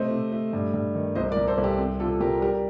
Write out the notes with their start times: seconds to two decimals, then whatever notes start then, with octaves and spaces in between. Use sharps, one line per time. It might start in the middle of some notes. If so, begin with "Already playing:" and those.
Already playing: C3 A3 C5 D#5
0.11 C3
0.32 A3
0.53 G2
0.74 G2
0.95 D#3
1.15 C2 C5 D#5
1.31 A#4 D5
1.37 C2
1.48 A4 C5
1.58 C2
1.64 G4
1.78 C4
2.00 C3 F4 A4
2.20 C2 G4 A#4
2.42 G3 G4 A#4